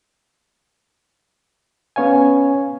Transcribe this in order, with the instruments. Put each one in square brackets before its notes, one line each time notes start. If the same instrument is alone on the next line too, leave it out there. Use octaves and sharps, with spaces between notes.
[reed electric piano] B3 C#4 C#5 F5 G#5